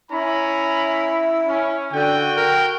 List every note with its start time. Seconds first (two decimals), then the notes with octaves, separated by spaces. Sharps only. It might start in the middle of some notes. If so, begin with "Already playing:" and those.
0.12 C#4 E4 A#5 B5
1.47 C#4
1.93 D3 F#4 G5
2.36 A#4